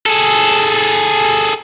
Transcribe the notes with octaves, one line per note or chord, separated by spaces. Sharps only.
G#4 A4